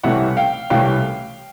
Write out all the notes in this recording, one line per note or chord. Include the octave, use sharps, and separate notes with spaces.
C2 C3 E3 A3 C#4 E5 F#5
F5 G5
C2 C3 E3 A3 C#4 F5 G5